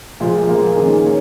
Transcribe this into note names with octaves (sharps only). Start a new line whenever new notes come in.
A#2 F3 G#3 F4
A#2 F3 A#3 F4 G#4
D#3 A#3 C#4 G#4
A#3 D#4 C#5